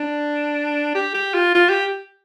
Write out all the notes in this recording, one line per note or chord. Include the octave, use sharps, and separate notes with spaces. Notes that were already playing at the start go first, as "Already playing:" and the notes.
Already playing: D4
G4
G4
F4
F4
G4